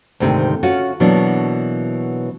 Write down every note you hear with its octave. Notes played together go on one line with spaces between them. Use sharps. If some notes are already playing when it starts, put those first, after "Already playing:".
D2 G#2 C3 D#3
C#4 F4 F#4
B2 E3 F#3 A#3 D4